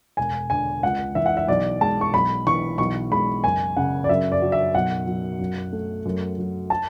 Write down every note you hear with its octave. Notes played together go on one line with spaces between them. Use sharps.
E1 G#5
D3 G#5
C#2 F#5
E3 E5
F#5
E5
B1 D5
G#3 A5
C#6
B1 B5
E3 C#6
B1 C#6
G#3 B5
F#1 G#5
C#3 F#5
D5
F#2 E5
D5
F#3
E5
B1 F#5
F#3
F#2
A3
F#2
F#3
A5